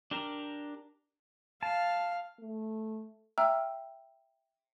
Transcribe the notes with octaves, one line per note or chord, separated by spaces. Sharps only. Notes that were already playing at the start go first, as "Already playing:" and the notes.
D4 G4 A#4 A#5
F5 A5
A3
E5 G5 A#5 E6 F6